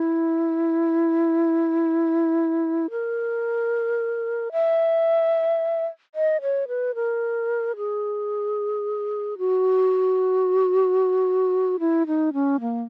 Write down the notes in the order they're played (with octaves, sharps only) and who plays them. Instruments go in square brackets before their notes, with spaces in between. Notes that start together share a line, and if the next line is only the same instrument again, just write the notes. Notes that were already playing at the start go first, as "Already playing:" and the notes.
Already playing: [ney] E4
A#4
E5
D#5
C#5
B4
A#4
G#4
F#4
E4
D#4
C#4
A#3